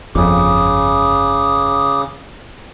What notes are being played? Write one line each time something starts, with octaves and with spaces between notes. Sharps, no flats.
G1 F2 C#3 D6 D#6